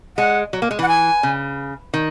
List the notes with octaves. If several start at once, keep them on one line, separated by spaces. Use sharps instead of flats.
G#3 F#5
F#3
A#3
G#3
E3 F#5
G#5
C#3
D#3